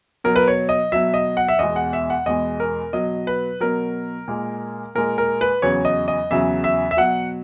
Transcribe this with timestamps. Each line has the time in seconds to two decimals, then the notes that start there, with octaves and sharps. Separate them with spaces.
0.24 B2 F#3 A#4
0.36 B4
0.48 C#5
0.69 D#5
0.92 B2 F#3 E5
1.14 D#5
1.37 F#5
1.48 E5
1.59 E2 B2 G#3 D#5
1.76 F#5
1.93 E5
2.10 F#5
2.26 E2 B2 G#3 D#5
2.60 A#4
2.93 B2 F#3 D#5
3.27 B4
3.60 B2 F#3 A#4
4.28 A#2 G#3
4.95 A#2 G#3 A#4
5.18 A#4
5.41 B4
5.62 E2 C#3 F#3 C#5
5.85 D#5
6.08 D#5
6.31 E2 C#3 F#3 E5
6.64 E5
6.91 E5
6.97 B2 F#3 F#5